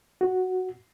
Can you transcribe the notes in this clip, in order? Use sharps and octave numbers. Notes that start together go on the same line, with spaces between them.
F#4